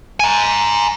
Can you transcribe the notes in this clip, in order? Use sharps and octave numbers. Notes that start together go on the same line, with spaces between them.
G#5 A#5